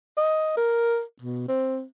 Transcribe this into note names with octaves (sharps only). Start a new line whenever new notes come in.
D#5
A#4
B2
C4